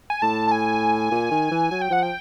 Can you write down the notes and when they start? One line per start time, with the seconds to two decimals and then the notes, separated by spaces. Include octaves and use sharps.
0.10 G#5
0.22 A2 A5
0.48 A5
0.52 G#5
1.11 A#2
1.31 D#3
1.51 E3
1.71 F#3 G#5
1.82 G5
1.90 F3 F#5
2.03 G5